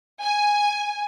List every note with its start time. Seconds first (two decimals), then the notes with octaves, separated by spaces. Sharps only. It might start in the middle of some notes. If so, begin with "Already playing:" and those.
0.21 G#5